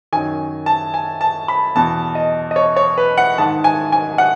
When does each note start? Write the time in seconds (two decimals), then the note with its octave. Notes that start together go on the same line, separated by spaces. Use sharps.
0.13 F#2 D#3 G#5
0.66 A5
0.94 G#5
1.21 A5
1.48 B5
1.75 E2 B2 A5
2.15 D#5
2.51 D#5
2.56 C#5
2.76 C#5
2.98 B4
3.18 F#5
3.38 G#2 D#3 A5
3.64 G#5
3.92 G#5
4.18 F#5